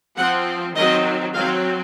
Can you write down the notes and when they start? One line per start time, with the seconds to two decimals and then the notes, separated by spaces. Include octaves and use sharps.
0.17 F3 C4 F#5
0.76 D#3 F#3 C4 D#5
1.35 F#3 C4 F5